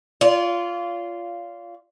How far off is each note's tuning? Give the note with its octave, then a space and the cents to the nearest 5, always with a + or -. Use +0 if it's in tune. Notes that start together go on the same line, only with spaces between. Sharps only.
F4 -10 D5 -45